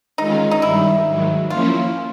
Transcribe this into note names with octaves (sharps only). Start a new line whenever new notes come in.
D#3 G#3 C#4 D#4 F4
D#4
G2 D#3 G3 E4
G#2 D#3 F#3
F3 A#3 C#4 E4 F4